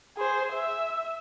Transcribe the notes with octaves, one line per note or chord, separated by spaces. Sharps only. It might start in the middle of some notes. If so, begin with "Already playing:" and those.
G#4 C5
E5